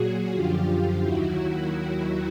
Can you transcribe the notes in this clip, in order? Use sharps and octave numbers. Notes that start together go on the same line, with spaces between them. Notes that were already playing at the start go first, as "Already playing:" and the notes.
Already playing: A#2 F#3 F#4 G#4
F#2 D3 F3 F4 G4
D#2 D#3 F#3 E4 F#4